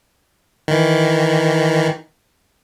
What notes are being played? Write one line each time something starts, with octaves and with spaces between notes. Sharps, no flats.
D#3 E3